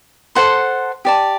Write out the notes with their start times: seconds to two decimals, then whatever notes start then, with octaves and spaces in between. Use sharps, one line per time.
0.35 A4 C5 F#5 C6
1.05 G4 D5 A5